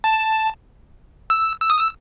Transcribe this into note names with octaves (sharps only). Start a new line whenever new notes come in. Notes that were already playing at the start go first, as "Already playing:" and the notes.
A5
E6
E6
D#6
E6